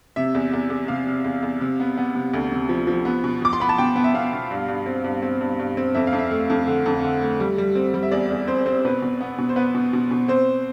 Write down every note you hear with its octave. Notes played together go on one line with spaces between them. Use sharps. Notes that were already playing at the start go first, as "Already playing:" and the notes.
C3 E5
E2
E2
E2
C3 F5
C3
E2
E2
C3
B3
B3
C3
D2
C3
F3
F3
B3
B2
B2 D6
C6
B3 B5
A5
B2 G5
B3
E5
B3 F5
B2
G2
G2
C4
G2
C4
G2
G2
C4
F2 E5
F5
F2
E5
A3
F2
D3
F2
D3
A3
G3
G3
C4
G3
E5
E2 D5
E2
C4 C5
C4
B2 B4
B2
B3
B2
C5
B3 B4
B2
B2
B2
C4 C5